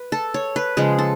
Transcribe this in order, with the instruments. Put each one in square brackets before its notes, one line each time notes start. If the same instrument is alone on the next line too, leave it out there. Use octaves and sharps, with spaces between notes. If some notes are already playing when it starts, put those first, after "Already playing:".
Already playing: [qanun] B4
A4
C#5
B4
C#3 F3 G#3 G#4
A4